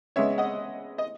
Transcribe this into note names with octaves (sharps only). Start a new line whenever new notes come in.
C#3 G#3 B3 C#5 E5
D#5 F#5
D#5